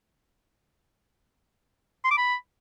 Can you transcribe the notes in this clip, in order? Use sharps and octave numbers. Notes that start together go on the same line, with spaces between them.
C6
D6
B5